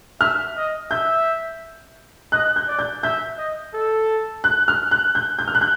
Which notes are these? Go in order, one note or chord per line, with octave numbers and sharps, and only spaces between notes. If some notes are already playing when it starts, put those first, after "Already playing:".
E5 F6
D#5
E5 G6
D#5 F#6
G6
D5
G6
E5 G6
D#5
A4
F#6
F6
F#6
G6
G6
F6
F#6
G6